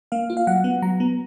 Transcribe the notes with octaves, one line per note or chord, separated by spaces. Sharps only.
A#3 F5
F4
F5
F#3 F#5
B3
F#3 A#5
B3